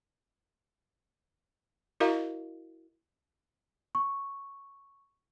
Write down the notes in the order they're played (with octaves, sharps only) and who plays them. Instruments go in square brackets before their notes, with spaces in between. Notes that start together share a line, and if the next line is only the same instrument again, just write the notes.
[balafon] E4 F#4 A#4 D#5 F5 A#5
[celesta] C#6